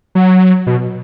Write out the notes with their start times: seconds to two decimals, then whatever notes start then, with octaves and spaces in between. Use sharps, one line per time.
0.15 F#3
0.67 B2